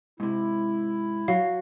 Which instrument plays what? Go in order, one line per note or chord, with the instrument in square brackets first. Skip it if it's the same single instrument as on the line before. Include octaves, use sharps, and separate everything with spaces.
[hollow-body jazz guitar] G#2 C3 [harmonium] E4
[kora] F#3 [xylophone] F5